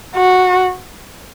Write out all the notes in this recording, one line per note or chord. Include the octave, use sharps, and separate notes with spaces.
F#4